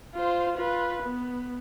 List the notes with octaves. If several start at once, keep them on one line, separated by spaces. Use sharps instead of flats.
F4 C5
F4 B4
B3